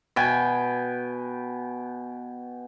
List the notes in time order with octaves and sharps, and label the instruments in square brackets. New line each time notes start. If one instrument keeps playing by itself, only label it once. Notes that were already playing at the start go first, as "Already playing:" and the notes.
[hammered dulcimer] B2 G5 G#5